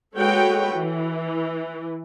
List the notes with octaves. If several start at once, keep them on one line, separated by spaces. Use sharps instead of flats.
G#3 F#4 A4 B4 C#5 G5
E3